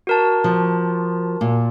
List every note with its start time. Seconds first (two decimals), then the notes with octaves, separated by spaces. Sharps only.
0.07 F#4 A#4 A5
0.44 F3
1.41 A#2